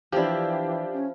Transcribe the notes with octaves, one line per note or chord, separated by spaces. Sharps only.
E3 F3 D4 E4 G4
C#4